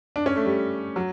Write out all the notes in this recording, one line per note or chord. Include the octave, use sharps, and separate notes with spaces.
D4
C#4
A3
G3
F#3